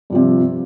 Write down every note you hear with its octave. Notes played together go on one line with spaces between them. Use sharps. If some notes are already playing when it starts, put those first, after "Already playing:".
G2 C3 F3